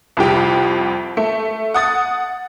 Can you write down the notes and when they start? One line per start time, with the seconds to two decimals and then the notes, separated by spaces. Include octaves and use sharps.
0.17 C2 F2 G4
1.17 A3
1.74 F#5 D#6 A6